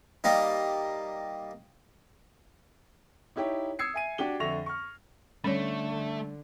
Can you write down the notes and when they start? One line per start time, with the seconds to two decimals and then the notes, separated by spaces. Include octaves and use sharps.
0.24 G3 A#3 D#4
3.36 D#4 E4 G4 C#5
3.79 D#6 E6 G#6 C7 C#7
3.94 E5 G#5 D#7
4.18 D4 F#4 G4 G7
4.40 F2 D3 E5 C#6 A#6 F7
4.66 C#6 F6
5.44 D3 G3 A3 C#4 C#5